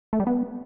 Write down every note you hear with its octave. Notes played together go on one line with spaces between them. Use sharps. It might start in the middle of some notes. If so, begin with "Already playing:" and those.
A3
G3
B3